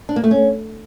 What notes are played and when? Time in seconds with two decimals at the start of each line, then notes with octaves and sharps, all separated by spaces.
0.09 D4
0.16 A#3
0.24 A3
0.31 C#4